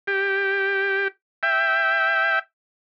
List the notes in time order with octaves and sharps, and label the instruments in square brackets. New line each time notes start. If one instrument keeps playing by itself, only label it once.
[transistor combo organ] G4
E5 G5